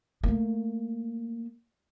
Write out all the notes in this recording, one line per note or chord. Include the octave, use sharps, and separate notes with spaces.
A3 A#3